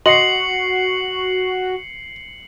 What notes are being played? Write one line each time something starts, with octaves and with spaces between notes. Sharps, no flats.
F#4 D#5 C6 C7 C#7 F#7